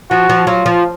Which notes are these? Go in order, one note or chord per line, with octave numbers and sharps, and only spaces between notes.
F3 F#4
F3
F#3 F4
F3